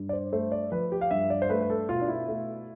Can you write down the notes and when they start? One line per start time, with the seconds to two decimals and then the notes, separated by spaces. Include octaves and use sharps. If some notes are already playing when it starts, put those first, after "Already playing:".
Already playing: G2
0.09 D5
0.13 C5
0.33 A3 C5
0.52 D5
0.72 F3 B4
0.92 G4
1.01 F5
1.11 G2 E5
1.30 D5
1.42 C5
1.50 A3 B4
1.61 B4
1.70 A4
1.89 B2 F4
2.01 D4
2.08 E4
2.28 A3